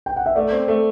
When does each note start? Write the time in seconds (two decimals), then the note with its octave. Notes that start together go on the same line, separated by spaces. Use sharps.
0.06 G5
0.16 F#5
0.26 E5
0.35 A3 D5
0.52 C4
0.68 A3